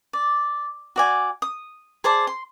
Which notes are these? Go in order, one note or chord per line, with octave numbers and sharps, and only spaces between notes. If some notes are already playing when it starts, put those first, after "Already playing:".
D5
F#4 D5 G#5
D#6
G#4 C5 D5 A5
C6